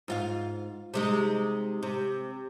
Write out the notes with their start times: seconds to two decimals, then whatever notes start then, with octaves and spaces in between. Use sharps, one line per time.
0.08 G#2 F4 F5
0.94 C3 G#3 D#4
1.83 C3